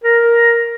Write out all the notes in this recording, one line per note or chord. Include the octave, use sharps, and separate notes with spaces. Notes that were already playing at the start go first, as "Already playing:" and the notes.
A#4